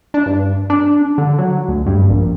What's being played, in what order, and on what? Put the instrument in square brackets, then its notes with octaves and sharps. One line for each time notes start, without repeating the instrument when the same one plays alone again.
[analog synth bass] D4
G2
D4
D3
F#3
D2
G2
A#1